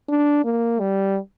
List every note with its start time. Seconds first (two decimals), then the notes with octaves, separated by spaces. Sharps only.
0.09 D4
0.45 A#3
0.80 G3